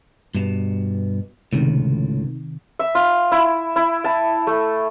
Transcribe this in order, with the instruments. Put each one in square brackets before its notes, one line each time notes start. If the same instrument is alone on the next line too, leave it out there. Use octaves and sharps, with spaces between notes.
[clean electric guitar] G2 B2
[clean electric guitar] C#2 A2 [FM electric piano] C3 D#3
[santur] E5
F4
E4
E4
A5
A3